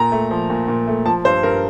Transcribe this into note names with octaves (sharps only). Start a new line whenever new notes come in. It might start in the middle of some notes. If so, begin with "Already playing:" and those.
Already playing: A#2 A#5
A3
F3
A#2
A#2
A3
F3 A5
G2 C5
G2 A#4